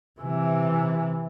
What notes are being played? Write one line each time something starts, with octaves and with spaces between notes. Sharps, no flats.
C3 E3